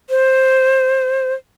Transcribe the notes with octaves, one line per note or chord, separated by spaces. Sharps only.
C5